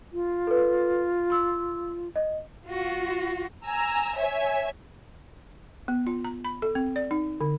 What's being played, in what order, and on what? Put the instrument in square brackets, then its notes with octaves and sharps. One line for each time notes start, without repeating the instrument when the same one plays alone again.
[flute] F4
[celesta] A4 B4
C6 E6
D#5
[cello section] F4 F#4
[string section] G#5 A#5 E6
C#5 E5 G#5
[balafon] B3
F4
A#5
B5
A4
C4
D5
D#4
D3